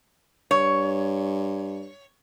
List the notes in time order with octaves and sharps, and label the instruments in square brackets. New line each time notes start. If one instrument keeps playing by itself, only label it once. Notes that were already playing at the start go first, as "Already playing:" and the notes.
[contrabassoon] G2 [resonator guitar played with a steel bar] C#5